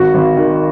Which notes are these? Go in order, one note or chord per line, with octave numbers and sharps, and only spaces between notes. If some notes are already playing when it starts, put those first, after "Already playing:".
Already playing: G#1 F#4
G#1
D#3